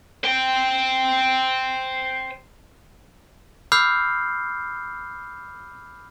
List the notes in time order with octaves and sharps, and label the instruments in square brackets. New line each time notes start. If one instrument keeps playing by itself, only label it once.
[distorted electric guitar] C5 G5
[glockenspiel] B5 D6 E6 F6 G6 C7